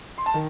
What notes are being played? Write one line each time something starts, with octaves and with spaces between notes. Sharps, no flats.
C6
A5
D#3